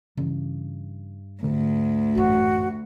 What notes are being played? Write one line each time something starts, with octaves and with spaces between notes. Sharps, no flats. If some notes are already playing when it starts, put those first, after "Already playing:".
G2 C#3 E3 C#4
D2 G#2 D3 A3
A1 F#2 F#4